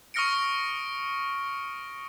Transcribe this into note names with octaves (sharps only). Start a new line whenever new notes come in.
C#6 D#6 F6 A#6 C#7 D7